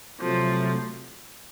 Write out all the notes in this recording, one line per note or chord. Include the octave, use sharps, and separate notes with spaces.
C3 F3 F#3 A3